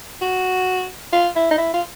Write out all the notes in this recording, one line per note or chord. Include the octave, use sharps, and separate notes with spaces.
F#4
F4
E4
D#4
E4
F4